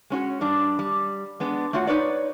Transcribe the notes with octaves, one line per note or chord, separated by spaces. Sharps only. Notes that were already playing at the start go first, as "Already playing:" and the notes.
G#3 C#4 F#4 C#5
G2 G3 D4
G3
G#3 B3 D4
A3 F4 F#4 C#5 F#5
D#4 E4 B4 C#5 D5